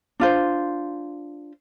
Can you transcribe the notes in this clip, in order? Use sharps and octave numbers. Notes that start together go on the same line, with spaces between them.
D4 F4 C5